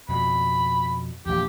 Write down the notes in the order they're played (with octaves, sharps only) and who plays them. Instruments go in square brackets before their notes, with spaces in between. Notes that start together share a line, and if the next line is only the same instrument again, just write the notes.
[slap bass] F2 B2 [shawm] B5
[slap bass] A#1 E2 [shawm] G4